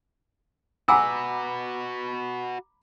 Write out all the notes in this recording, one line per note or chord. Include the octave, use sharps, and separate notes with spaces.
F#4 B4 F#5 G#5 A#5 B5 D6 E6